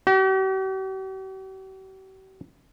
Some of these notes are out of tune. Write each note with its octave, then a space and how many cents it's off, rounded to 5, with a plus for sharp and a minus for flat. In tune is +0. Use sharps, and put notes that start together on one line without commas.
G4 -45